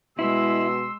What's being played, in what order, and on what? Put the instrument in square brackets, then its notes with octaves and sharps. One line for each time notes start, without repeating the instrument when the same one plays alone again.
[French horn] B2 [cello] G#3 [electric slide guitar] E4 [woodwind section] C6 E6